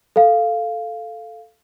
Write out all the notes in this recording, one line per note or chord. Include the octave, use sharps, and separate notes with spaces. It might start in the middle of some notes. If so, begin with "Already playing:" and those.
A4 F5